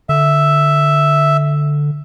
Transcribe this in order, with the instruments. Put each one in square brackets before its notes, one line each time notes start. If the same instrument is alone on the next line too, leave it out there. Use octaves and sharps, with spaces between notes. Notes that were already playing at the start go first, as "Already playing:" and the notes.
[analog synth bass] D3 [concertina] E5